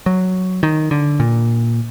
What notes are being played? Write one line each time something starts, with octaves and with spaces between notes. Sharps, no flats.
F#3
D#3
D3
A#2